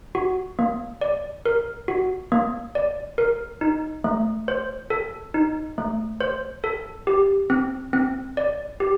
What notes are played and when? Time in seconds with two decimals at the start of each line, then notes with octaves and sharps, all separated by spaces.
0.15 F#4
0.59 A#3
1.01 D5
1.46 A#4
1.88 F#4
2.32 A#3
2.75 D5
3.18 A#4
3.61 D#4
4.04 A3
4.48 C5
4.90 A4
5.34 D#4
5.78 A3
6.21 C5
6.64 A4
7.07 G4
7.50 C4
7.93 C4
8.37 D5
8.80 G4